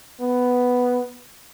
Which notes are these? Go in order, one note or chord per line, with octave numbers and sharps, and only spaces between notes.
B3